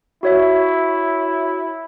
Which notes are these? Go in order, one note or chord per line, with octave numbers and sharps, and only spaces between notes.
E4 F#4 C#5 E5